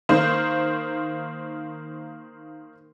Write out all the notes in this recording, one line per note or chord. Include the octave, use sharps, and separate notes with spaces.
D#3 A#3 C5